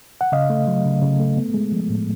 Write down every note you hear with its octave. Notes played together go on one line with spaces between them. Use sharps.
F#5
C#3 D#5 F5
A3
F#3
C#3
C#3
A3
B3
G#3
F3
A2